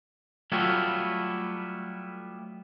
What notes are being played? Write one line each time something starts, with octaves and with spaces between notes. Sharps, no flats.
F#3 G3 A3 B3 E4 F4